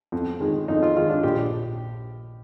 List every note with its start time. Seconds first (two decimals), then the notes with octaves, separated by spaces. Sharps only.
0.12 F2
0.40 D#3 G#3
0.68 F2 D#4
0.82 F4
0.96 D#3 G#3 F4
1.09 D4
1.23 A#1 G4